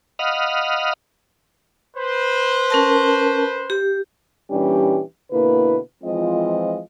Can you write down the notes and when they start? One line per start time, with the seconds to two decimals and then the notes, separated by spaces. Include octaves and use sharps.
0.19 D#5 F5 F#5 B5 D#6 F6
1.96 B4 C5
2.70 C#4 A#4 A5
3.70 G4
4.50 A#2 E3 G3 C#4 D4 G4
5.32 B2 D3 A#3 E4 B4
6.03 E3 F3 G#3 C4 F4 D#5